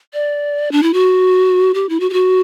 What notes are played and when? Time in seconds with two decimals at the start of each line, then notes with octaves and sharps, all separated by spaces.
0.13 D5
0.72 D4
0.83 E4
0.94 F#4
1.74 G4
1.89 E4
2.00 F#4
2.10 G4
2.13 F#4